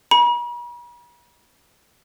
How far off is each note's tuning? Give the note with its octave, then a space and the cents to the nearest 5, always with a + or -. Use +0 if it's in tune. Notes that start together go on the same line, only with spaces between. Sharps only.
B5 -45